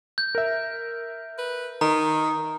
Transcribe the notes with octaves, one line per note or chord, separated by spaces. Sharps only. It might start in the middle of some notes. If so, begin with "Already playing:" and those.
G6
A#4 E5
B4
D#3 A#5